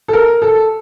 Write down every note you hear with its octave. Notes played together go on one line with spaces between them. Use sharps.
A4
A#4
A4